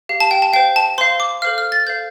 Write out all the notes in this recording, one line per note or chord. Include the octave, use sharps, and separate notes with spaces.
G4 F5
A5
G5
A5
C5 F5 G5
A5
C5 F5 C6
D6
A4 C5 F5 F6
F6
A6
A4 C5 F5 G6